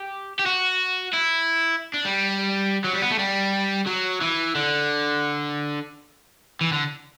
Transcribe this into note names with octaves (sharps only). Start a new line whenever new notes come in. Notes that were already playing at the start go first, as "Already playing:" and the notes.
Already playing: G4
G4
F#4
E4
D4
G3
F#3
G3
B3
A3
G3
F#3
E3
D3
E3
D3